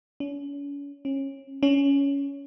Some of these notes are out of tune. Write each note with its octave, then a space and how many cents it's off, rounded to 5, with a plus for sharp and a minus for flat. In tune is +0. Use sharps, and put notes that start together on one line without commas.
C#4 +40
C#4 -25
C#4 +15